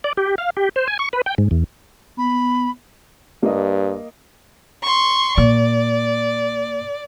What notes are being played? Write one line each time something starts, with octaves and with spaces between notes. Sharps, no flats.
D5
G4
F5
G4
C5
G#5
C#6
B4
G5
G#2
E2
B3 B5
G2 A#3 D#5
C6 C#6
A#2 D5